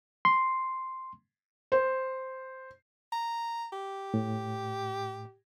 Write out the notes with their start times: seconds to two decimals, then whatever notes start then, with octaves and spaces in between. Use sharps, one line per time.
0.25 C6
1.72 C5
3.13 A#5
3.72 G4
4.14 A2